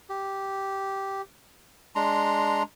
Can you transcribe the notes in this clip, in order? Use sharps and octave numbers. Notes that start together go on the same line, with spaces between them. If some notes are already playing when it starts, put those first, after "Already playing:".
G4
G#3 D4 A#5 C6